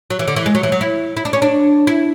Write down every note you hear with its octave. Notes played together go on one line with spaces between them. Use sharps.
F#3
E3
D3
E3
G#3
F#3
E3
F#3
E4
E4
D4
C#4
D4
E4